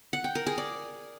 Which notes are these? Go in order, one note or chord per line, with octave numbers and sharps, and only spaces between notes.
F#5
G5
A#4
G#4
D5